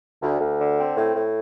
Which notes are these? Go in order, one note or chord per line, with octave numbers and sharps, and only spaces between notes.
D2
D2
D3
C4
A2
A2